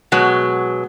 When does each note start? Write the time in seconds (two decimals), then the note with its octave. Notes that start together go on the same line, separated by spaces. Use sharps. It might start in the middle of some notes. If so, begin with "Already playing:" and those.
0.12 B2 F#3 G#3